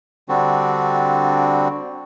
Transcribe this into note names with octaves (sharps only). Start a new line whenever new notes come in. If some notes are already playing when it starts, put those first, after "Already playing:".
D3 G3 C4 D4 F#4